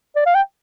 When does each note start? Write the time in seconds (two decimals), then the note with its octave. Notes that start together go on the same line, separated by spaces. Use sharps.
0.16 D5
0.26 F5
0.35 G5